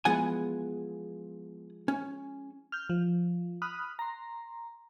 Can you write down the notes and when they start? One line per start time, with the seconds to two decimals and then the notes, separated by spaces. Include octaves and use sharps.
0.05 F3 G#3 B3 E4 F#5 G#5
1.88 C#4
2.72 F6 G6
2.90 F3
3.62 B5 D#6 F6 F#6
3.99 A#5 C6